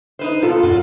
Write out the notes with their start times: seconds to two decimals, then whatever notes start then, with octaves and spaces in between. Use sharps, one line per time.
0.19 D#4 B4 C5
0.42 A#2 B3 F4 A4
0.63 F#2 F4 F#4